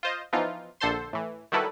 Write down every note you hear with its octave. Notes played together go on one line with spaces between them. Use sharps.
F4 C5 D#5
E3 F3 B3 D#4 F4
A#1 D3 A4 C5 C6
A2 E3
D#3 F#3 G3 E4 A4 B4